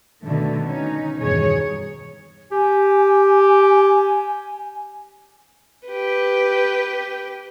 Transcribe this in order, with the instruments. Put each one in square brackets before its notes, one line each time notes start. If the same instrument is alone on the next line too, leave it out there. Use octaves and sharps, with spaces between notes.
[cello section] B2 D3 D#3 A3
C#4 D#4
E2 G2 B2 D#3 G#4 C#5
[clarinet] G4 [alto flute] G#5
[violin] G4 B4